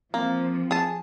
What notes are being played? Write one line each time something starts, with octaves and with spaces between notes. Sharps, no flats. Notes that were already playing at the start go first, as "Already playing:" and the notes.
F3 A#3 C4
G#4 A5